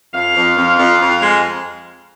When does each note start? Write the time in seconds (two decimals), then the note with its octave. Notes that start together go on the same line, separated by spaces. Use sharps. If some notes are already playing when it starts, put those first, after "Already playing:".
0.14 F2 F5
0.35 F2
0.57 F2
0.78 F2
0.99 F2
1.21 G#3